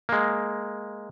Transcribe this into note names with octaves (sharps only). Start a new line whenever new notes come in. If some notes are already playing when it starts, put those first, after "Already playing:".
G#3 A#3